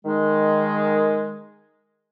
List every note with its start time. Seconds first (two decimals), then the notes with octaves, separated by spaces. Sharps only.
0.05 D#3 G#3